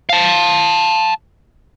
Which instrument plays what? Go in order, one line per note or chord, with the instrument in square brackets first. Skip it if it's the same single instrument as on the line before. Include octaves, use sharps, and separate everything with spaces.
[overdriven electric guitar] F5 A5